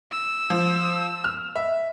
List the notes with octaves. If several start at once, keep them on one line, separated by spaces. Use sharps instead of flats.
E6
F3
F6
E5